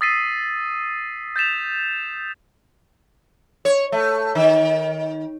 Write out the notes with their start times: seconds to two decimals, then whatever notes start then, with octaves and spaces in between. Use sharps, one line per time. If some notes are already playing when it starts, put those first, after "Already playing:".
0.01 D#6 E6 A6 B6 C7 D#7
1.36 G6 A6 B6 E7 F7
3.65 C#5
3.92 A3
4.35 D#3